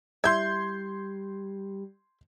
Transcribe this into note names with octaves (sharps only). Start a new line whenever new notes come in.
G3 E4 E5 C6 G6 G#6